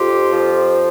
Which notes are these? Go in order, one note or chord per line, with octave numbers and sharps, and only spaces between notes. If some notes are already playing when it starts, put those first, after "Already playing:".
Already playing: F2 F4 G4
F3